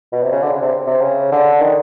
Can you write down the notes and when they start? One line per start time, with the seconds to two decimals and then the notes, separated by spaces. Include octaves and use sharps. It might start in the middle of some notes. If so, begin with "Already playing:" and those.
0.12 B2
0.22 C3
0.32 C#3
0.42 D3
0.52 C#3
0.62 C3
0.87 C3
1.01 C#3
1.31 D3
1.61 D#3